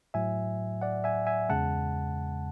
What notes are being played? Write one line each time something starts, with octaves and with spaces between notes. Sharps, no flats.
A2 F#3 E5 G#5
D5 F#5
E5 G#5
E5 G#5
E2 C#3 G#3 F#5 A5